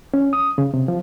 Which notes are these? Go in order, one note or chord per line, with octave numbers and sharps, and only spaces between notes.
C#4
D#6
C#3
C3
F3